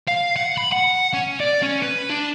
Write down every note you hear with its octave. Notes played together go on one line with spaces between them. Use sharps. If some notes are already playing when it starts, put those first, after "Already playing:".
F5
F#5
B5
F#5
C#4
D5
C#4
B4
D4